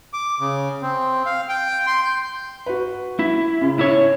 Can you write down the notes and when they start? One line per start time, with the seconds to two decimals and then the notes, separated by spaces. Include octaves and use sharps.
0.14 D6
0.40 C#3
0.82 C4
1.26 F5
1.49 G5
1.87 C6
2.05 G6
2.66 F#4 B4
3.19 E4
3.61 C#3
3.79 E4 C#5